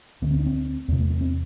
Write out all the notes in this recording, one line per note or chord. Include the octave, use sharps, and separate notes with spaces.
D2 D3 B3
C4
D4
C4
E2 C3 B3
A3
B3
C4